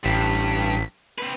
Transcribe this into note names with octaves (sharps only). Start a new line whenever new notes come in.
A1 G2 B6
C4 B4